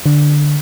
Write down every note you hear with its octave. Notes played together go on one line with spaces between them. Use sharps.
D3